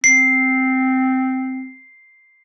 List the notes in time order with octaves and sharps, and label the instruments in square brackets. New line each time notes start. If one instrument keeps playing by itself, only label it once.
[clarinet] C4 [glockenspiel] C7